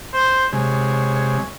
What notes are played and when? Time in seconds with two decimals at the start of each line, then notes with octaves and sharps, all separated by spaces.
0.13 C5
0.53 C3 G#3 C#5